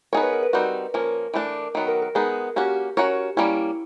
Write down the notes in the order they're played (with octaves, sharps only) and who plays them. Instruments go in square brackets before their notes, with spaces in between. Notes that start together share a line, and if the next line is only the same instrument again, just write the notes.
[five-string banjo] B3 D#4 G#4 C#5 [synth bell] A#4
[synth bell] B4
A#4
B4
[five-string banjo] G3 C4 D#4 F#4
[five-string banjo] F3 A#3 C#4 [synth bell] A#4
[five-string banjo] E3 A3 D4
D#3 F#3 B3
[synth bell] A#4
A#4
[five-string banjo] G#3 B3 D#4 [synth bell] G#4
[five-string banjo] A#3 C#4 F#4 [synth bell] G4
[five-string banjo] C#4 F#4 A#4 C#5
[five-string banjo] G3 A#3 C#4 [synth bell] E4